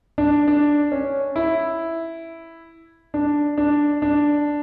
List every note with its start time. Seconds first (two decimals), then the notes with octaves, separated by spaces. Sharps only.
0.18 D4
0.48 D4
0.92 C#4
1.36 E4
3.14 D4
3.57 D4
4.02 D4